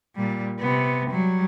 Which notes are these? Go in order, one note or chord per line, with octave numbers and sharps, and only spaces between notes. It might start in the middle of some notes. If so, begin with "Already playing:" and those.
A#2 G3
C3 B3
F#3 G3